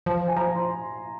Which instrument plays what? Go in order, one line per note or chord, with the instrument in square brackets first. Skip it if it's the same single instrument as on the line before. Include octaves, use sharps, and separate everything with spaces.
[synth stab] F3
[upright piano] G#5
[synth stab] F3 [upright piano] A#5
[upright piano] C6